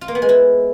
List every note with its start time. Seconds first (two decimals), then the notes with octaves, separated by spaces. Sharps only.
0.01 F4
0.08 A#3
0.15 B3
0.22 G#3
0.29 E4